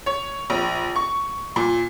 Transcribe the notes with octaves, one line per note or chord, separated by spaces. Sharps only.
C#5
A#1
C#6
A#2